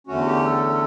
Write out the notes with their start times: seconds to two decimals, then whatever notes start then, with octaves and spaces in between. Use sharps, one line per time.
0.07 E2 D3 A3 C#4 F#4
0.26 G4
0.45 A4